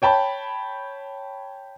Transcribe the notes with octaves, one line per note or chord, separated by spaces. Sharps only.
C#5 G5 A5 B5